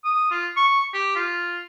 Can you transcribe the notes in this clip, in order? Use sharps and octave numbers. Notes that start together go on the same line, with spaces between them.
D#6
F4
C#6
G4
F4